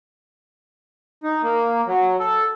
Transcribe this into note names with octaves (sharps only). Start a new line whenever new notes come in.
D#4
A#3
F#3
A4